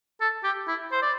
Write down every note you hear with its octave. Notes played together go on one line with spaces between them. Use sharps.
A4
G4
E4
C5
D5